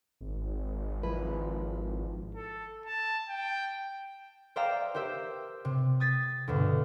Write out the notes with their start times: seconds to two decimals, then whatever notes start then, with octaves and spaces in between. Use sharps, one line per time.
0.21 G#1
1.03 F3 E4 B4
2.35 A4
2.86 A5
3.29 G5
4.56 C5 D5 E5 F5 G5 A#5
4.94 G4 A#4 C5 E5
5.65 C3
6.00 D#6 G#6 A6 B6
6.48 D2 G2 B2